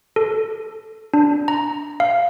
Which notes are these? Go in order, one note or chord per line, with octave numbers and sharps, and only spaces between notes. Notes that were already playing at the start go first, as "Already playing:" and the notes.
A4
D4
A#5
F5